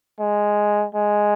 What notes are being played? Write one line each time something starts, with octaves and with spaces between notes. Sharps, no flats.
G#3
G#3